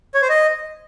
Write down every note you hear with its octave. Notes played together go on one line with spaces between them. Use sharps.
C#5
C5
D#5